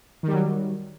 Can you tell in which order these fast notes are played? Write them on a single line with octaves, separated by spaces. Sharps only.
D#3 G3 F#3